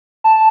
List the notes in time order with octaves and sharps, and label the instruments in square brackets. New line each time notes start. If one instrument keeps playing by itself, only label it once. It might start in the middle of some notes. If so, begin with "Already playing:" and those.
[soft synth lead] A5